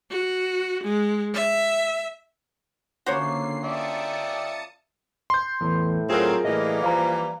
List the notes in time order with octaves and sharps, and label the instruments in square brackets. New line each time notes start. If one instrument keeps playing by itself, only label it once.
[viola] F#4
G#3
E5
[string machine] D3 C7 [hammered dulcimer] A#3 C#4 F4 [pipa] F#4 C5 C#5
[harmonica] D5 E5 G5 [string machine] A5 D#6 C#7
[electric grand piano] C6 G6
[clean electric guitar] E2 [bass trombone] A2
[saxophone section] F#3 C4 [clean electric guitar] F4 [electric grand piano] G#4 A#4
[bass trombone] A2 [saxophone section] E3 G3 A#3 [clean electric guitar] D#5
[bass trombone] F3 [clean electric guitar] F5 A#5